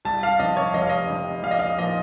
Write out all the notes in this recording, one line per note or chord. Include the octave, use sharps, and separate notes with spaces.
C2 A5
F5
C3 F3 D#5
C#5
F1 D#5
F5
D#5
F2 C3
A#1 F5
D#5
F5
A#2 F3 D#5